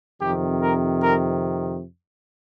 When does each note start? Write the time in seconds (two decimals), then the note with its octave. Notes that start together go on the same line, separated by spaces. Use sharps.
0.21 F2 C3 D#3 G4
0.61 A#4
1.02 A#4